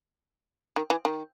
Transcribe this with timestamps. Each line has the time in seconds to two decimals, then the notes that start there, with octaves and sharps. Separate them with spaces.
0.76 D#3
0.90 E3
1.05 D#3